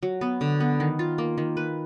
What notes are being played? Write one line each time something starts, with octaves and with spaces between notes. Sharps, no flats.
F#3
B3
D3
B3
D#3
F4
A#3
D#3
B4